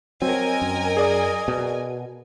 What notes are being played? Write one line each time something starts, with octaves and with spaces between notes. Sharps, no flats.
F#3 C4 A#4 D#5 G#5
F#2
G#4 D5 D#6
B2